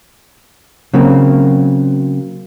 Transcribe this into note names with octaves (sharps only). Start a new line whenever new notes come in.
C#3 F#3 A#3 C4